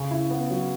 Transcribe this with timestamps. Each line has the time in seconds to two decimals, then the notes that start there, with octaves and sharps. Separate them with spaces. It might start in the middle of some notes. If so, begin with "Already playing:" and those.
Already playing: C#3
0.11 E4
0.31 B3
0.50 F#3